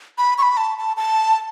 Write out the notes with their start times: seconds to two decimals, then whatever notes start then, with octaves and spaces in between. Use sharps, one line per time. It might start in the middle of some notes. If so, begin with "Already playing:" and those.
0.18 B5
0.38 C#6
0.43 B5
0.57 A5
0.78 A5
0.97 A5